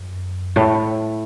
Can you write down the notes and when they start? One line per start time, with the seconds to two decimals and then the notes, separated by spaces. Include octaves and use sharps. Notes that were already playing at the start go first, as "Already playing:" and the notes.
Already playing: F#2
0.56 A2